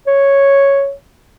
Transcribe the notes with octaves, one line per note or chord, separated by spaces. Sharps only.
C#5